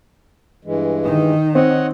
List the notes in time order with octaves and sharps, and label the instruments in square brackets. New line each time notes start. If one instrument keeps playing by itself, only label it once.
[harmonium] G2 E3 G#3
[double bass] D#3 D#4
[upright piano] C4 [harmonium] C#5 D#5 F#5